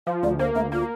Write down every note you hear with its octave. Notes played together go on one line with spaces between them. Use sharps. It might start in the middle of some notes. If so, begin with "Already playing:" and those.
F3 F5
D2 D5
A#3 C5
D2 E5
A#3 F4